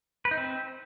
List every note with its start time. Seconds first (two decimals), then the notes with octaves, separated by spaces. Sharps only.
0.25 B4
0.31 D#4
0.37 C4